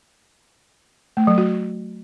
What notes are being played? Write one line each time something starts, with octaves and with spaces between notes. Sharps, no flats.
A3
F#3
F#4